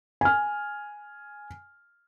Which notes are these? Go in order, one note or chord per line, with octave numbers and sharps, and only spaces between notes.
G#5 F6